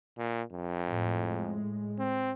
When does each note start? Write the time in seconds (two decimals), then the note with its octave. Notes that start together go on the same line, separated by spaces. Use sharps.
0.18 A#2
0.52 F2
0.88 A2 G#3
1.99 C4